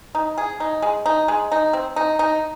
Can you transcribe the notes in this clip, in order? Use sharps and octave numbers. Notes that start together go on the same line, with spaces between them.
D#4
G#4
D#4
G#3
D#4
G#3
D#4
C4
D#4
D#4